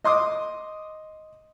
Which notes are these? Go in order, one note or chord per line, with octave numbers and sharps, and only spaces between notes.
D#5 C6 D6 D#6